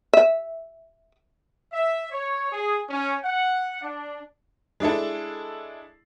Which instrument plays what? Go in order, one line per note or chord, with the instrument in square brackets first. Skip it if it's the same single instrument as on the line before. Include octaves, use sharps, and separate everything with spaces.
[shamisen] E5
[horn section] E5
C#5
G#4
C#4
F#5
D4
[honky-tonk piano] G#3 D4 E4 A4